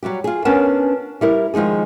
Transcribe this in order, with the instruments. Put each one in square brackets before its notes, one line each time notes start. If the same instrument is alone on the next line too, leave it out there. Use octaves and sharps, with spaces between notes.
[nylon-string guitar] F#3 G3 F#4 G4
F4 G#4
B3 C#4 D4 A#4 A5
G3 E4 A#4
D#3 F3 G#3 D#4 G#4